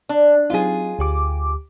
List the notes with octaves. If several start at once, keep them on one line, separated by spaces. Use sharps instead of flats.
D4
F#3 C4 D#4 F4 G#4
D2 G4 D6